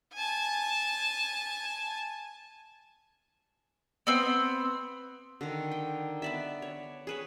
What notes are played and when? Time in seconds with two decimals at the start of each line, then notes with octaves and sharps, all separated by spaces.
0.14 G#5 A5
4.07 B3 C4
5.41 D3 D#3
5.71 G5
6.22 B3 D5 E5
6.62 C#5
7.07 G#4 B4 C#5